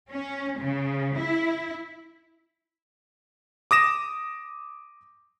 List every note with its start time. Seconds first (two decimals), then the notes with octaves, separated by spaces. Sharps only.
0.10 C#4
0.58 C#3
1.17 E4
3.71 D6 D#6 A#6 E7